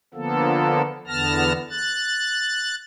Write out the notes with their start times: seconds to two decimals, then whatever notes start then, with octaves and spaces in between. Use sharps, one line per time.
0.14 D3 F3 A#3 B3 A4
1.07 E2 D3 B3 A5 F6 A#6
1.70 F#6 A6